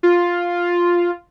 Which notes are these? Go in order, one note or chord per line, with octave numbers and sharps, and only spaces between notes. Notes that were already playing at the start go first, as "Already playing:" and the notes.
F4